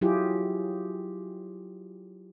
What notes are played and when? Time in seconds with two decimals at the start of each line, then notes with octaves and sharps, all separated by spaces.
0.01 F#3 E4 F4 G4 G#4